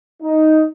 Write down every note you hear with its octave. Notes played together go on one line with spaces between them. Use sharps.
D#4